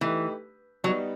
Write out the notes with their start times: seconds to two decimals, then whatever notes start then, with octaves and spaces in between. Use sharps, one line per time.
0.01 E3 A3 D#4 G4 B4
0.84 F#3 G3 B3 D#4